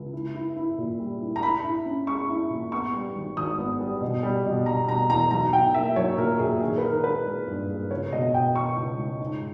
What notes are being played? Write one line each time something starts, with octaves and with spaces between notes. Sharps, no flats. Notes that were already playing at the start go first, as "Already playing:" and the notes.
Already playing: C#2
E4
E4
E4
A#2
G3
E4
A#5
E4 B5
E4
C#4
G#3 C#6
E4
A#2
B3 C#6
G3
G#1
G#1 D#6
B3
G3
B2
G3
B2
G3 A#5
B2 A#5
E2 A#5
B1 A#5
B1 G5
A#3 E5
B1 C#5
A#2 A#4
A#2 G#4
D#3 G#4
B4
D#3 A#4
G#3 B4
G#3
G2
G#3
C#2 C#5
B2 D#5
B2 G5
B2 C#6
C#2
C#2
G#2